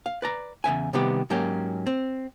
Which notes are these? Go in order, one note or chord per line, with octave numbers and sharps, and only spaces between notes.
F5
B4 D5 A#5
E2 C#3 E5 G#5
C3 D#3 G3 B3 G4
G#2 F#3 A#3 C#4 G4
C4